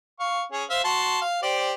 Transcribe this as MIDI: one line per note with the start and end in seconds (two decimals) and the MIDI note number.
0.20 0.43 77
0.20 0.43 85
0.52 0.64 61
0.52 0.64 68
0.70 0.79 72
0.70 0.79 76
0.70 0.79 77
0.84 1.20 66
0.84 1.20 81
0.84 1.20 84
1.21 1.42 77
1.43 1.73 67
1.43 1.73 72
1.43 1.73 74